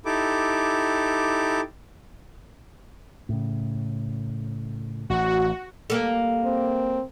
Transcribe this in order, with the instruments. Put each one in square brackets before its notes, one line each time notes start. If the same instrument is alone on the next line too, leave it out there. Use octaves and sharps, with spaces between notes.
[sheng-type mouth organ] D#4 E4 G4 A4 D6
[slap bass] A2 C#3
[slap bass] A1 [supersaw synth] F#4
[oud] G3 A#3 A4
[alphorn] C4